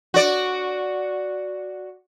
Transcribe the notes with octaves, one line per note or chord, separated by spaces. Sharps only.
F#4 D5